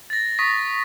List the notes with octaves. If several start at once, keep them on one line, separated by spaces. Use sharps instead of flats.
A6 A#6
C#6 D#6 A#6 B6